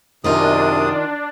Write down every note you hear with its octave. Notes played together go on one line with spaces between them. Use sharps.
F#2 C3 D#3 D4 D#4 F4 D#6